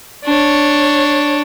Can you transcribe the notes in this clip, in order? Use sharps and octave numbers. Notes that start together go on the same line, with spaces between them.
D4 C#5